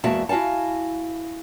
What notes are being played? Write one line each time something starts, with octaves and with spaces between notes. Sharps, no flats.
E2 G#3 A#3 F#4 E5 A5
E4 F#4 F5 G#5 A5